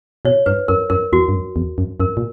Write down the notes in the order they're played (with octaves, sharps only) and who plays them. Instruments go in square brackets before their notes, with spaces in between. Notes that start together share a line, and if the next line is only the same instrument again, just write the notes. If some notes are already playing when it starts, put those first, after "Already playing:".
[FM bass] B2 [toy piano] C#5
[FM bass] G2 [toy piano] B4
[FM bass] F#2 [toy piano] A#4
[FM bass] F#2 [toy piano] A#4
[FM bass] E2 [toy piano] F#4
[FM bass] G2
F#2
E2
F#2
[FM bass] F#2 [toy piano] A#4
[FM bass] A#2